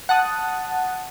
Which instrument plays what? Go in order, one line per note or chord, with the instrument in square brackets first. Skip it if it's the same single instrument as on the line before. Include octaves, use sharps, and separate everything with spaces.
[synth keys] F#5 A5 D#6